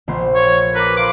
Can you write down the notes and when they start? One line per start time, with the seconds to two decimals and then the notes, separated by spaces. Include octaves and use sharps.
0.08 A#1 B3 C5
0.35 C#5
0.75 A#4 B4 D6
0.97 B4 F5 C6 D6